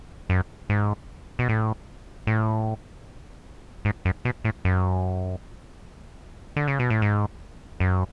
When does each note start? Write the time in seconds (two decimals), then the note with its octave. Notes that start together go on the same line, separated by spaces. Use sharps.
0.30 F#2
0.69 G#2
1.39 B2
1.49 A2
2.27 A2
3.85 G#2
4.05 F#2
4.25 B2
4.45 A2
4.65 F#2
6.56 D3
6.68 C#3
6.79 B2
6.90 A2
7.02 G#2
7.80 F#2